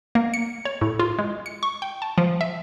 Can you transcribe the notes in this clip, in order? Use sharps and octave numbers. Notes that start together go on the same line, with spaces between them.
A#3
C#7
C#5
A2
F4
G#3
C#7
C#6
G5
A5
F3
E5